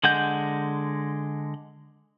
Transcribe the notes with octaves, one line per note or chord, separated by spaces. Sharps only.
D3 G#3 F#5 G6